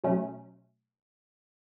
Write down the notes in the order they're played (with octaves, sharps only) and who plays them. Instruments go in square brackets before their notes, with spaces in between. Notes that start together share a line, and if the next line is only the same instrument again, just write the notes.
[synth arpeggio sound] B2 F#3 A3 C#4